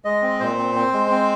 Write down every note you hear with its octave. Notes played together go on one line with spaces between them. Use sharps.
G#3 D#5
C4
A#2 C5
C4
C4
G#3
C4